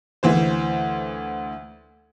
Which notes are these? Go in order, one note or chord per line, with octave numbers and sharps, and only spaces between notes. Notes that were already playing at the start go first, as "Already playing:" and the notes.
D2 E3 C5